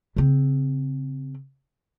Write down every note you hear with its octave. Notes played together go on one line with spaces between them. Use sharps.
C#3 C4